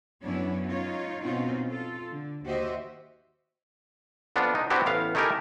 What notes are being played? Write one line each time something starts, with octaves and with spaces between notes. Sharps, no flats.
F#2 B3 C#4 D4 E4 C#5
D#4 F4 C#5
B2 C4 C#4 D#4 F4 F#4
F4 A4
D3
D#2 F#4 G4 C5 D#5 E5
F2 B3 D4 F4
D#4
B3 C4 D4 E4 F#4 G4
A1 B3 F5
A3 D#4 E4 G4 A#4 G#5